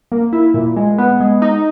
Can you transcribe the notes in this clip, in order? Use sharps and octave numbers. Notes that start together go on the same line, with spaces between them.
A#3
E4
A#2
G#3
B3
G#3
D#4